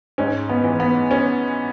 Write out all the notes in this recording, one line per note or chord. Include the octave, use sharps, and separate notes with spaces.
G#2 C#4
B3
E3
B3
C#4